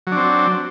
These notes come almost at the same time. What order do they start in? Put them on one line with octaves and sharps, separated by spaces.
F#3 D4 C4